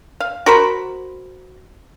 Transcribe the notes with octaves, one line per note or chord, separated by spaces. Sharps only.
F5
F#4 A#4 C5 B5